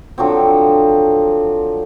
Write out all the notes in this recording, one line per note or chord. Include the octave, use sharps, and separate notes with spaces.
D3 F3 F#3 C4